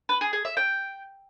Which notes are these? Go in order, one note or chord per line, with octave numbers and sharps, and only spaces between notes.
B4
G#4
G#4
E5
G5